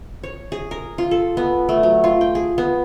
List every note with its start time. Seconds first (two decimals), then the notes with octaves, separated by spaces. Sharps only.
0.23 C#5
0.52 G#4
0.71 A#4
0.98 F4
1.11 A4
1.37 B3
1.69 A3
1.83 F#3
2.04 F4
2.21 G5
2.35 G#4
2.58 B3